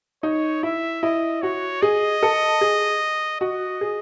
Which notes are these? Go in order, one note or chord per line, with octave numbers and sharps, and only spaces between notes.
D#4 C#5
E4 E5
E4 D#5
F#4 C#5
G#4 D#5
A4
G#4
F#4 D#5
G#4